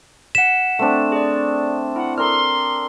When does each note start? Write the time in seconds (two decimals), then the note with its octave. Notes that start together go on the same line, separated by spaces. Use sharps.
0.35 F#5 B6 E7
0.79 A3 C4 D4
1.12 G#4 D5
1.96 E4 F#5
2.18 A4 A#4 D5 C6 F6